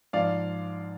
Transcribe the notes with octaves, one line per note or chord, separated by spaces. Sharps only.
G#2 F3 D5 F5